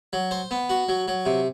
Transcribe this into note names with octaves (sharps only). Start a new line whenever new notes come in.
F#3
C5
B3
F#4
F#3
F#3
C3